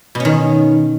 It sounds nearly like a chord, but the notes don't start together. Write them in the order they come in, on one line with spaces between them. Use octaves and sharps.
B2 C#4 D#3